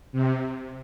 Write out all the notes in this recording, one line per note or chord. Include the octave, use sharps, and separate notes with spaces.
C3